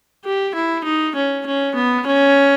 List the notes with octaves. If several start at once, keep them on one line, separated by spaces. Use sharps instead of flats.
G4
E4
D#4
C#4
C#4
B3
C#4